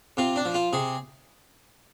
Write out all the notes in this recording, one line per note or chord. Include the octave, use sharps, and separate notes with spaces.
C3 F4
D4
F3
F4
C3 G#4